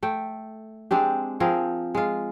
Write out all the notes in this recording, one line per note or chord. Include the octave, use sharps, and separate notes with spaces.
A3 G5
G#3 C4 D4 G4
F3 C4 G#4 A#4
G#3 F4